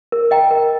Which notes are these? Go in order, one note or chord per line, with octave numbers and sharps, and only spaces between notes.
A#4
D#5 G5 A#5
A#4